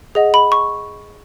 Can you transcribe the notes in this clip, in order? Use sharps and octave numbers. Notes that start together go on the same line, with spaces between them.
G#4 D#5 F#5
B5
C#6